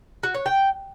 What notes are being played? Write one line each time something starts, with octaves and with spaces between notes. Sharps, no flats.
F#4
C#5
G5